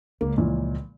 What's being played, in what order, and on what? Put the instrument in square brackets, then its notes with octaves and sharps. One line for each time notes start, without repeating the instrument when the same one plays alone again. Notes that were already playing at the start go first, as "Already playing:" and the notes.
[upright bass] C#2 [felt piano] A#3
[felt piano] A#2 E3 F3